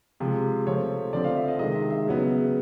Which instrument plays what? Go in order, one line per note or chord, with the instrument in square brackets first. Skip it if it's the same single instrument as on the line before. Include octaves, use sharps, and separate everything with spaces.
[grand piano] C3 F3 G#3
C3 F3 A3 C4 C#5
D3 F3 A3 C4 D5
F5
E5
D#5
C3 D#3 G#3 D#5
E5
E5
C#3 F#3 B3